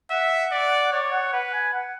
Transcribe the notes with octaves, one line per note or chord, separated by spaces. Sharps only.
E5 F#5
D5
C#5 D5
F#5
B4 F#5
G#5
F#5